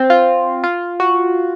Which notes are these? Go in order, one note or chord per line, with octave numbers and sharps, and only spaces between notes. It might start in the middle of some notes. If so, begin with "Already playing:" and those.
Already playing: C4
F4
F4
F#4